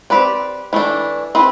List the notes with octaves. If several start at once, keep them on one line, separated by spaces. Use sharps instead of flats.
C4 G4 B4 D5
E3 A3 D4
C4 E4 B4